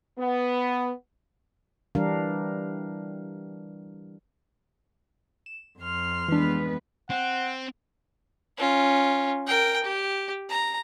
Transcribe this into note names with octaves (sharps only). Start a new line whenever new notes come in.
B3
E3 G3 D4 G4 A#4 F5
E7
F2 C6 F6
E3 G#3 B3 D4 B4
C4 F#5
C#4 F4
A#4 G5
G4
A#5